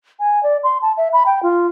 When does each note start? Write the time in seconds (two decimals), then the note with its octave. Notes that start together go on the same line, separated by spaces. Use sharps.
0.20 G#5
0.43 D5
0.63 C6
0.82 A5
0.97 E5
1.13 B5
1.26 G5
1.43 F4